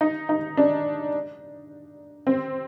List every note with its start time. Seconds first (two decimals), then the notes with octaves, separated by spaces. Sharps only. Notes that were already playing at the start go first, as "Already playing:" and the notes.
0.01 D#4
0.29 D#4
0.57 D4
2.27 C4